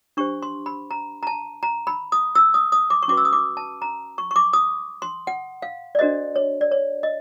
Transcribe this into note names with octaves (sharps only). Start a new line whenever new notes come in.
D4 G4 C5 C#6
C6
B5
A#5
A#5
A5
A#5
B5
D#6
E6
D#6
D#6
D6
C#6
C#4 F#4 B4 D6
E6
D#6
D6
A5
A#5
C#6
C#6
D6
D#6
C6
F#5
F5
D5
D4 F#4 A4 C5 D#5
C#5
D5
C#5
D#5